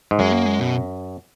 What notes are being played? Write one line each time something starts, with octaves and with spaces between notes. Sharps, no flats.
G#2
F#2 G#3
A#3
G#3
B2